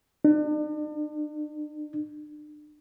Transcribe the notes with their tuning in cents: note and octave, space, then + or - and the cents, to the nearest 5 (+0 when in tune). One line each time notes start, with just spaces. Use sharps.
D4 +40